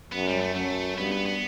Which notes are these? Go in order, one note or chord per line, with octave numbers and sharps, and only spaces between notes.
F#2 B3
G3
A3
F#2 A3
G2 B3
B3
B3